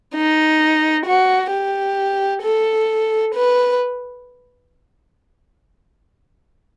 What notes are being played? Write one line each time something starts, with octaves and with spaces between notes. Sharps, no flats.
D#4
F#4
G4
A4
B4